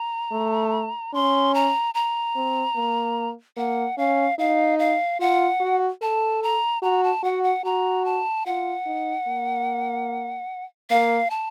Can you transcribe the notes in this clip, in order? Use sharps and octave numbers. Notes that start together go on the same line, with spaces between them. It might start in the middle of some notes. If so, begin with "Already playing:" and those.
Already playing: A#5
A3
C#4 C6
A#5
A#5
C4
A#3
A#3 F#5
C#4 F5
D#4 F5
F5
F4 F#5
F#4
A4 A5
A#5
F#4 A#5
A5
F#4 F#5
F#5
F#4 A#5
A5
F4 F#5
D#4
A#3
A#3 F5
A5